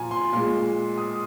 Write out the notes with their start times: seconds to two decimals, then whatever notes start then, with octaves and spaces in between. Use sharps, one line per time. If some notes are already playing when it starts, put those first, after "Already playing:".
Already playing: A#2 F3 G#5 A#5
0.11 C6
0.33 A#2 G#3
0.98 D#6